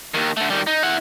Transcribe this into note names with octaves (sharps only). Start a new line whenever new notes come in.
D#2 D#3
D3 A3
D#3 G3
D#4
E4 F#5